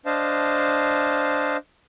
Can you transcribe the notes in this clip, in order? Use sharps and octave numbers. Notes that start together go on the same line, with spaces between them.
D4 C5 D#5 F5 A5